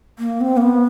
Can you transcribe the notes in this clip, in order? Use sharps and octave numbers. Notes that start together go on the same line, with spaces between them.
A#3
C4
A#3
B3